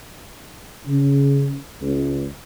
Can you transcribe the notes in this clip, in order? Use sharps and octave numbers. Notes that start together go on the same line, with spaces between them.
C#3
C#2